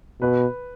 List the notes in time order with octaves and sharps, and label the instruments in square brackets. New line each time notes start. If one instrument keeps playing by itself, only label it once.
[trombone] B2 [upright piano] B4